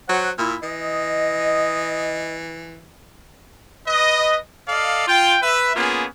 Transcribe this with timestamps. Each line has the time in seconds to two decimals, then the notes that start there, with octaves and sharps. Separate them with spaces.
0.09 F#3 C5 F#5
0.38 A#2 E4
0.63 E3 D#5
3.87 B4 D#5
4.68 A4 D5 D#5 F5
5.08 F4 G5
5.42 B4 E5
5.76 A#3 B3 C#4 F4 G#4